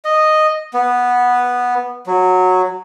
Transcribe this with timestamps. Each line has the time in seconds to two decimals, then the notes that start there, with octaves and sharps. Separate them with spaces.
0.05 D#5
0.74 B3
2.06 F#3